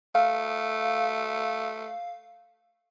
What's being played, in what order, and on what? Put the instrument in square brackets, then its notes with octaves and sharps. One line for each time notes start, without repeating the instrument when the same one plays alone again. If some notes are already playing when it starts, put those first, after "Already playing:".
[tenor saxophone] A3 [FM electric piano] F5